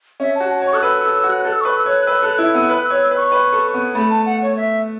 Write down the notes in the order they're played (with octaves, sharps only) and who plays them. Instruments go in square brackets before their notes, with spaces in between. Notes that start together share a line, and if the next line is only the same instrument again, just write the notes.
[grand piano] C#4 [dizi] E5
[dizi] A5
[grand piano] F#4
[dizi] A5
[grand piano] C#5 [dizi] C#6
[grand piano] A4 [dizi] F#6
[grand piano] B4 [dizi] E6
[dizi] E6
[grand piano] A4
[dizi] E6
[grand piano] F#4 [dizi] F#6
[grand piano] A4 [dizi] F#6
[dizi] E6
[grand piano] B4 [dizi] C#6
[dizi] E6
[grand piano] C#5
[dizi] F#6
[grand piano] B4 [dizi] E6
[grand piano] A4 [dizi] F#6
[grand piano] E4 [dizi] E6
[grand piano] B3 [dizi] E6
[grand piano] B4 [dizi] F#6
[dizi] E6
[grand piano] C#5
[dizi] E6
[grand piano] B4
[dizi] C#6
[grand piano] B4
A4
B3
[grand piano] A3 [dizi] B5
[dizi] A5
F#5
C#5
E5